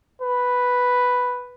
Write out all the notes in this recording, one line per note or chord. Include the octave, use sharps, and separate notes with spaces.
B4